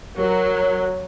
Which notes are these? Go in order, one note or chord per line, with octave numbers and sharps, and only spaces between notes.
F#3 A#4